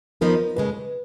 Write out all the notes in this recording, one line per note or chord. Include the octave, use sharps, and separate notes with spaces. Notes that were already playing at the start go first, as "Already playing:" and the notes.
F3 B3 D#4 A#4
D#2 C#3 G#3 B4